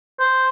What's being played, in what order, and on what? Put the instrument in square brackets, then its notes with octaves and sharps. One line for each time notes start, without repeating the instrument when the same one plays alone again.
[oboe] C5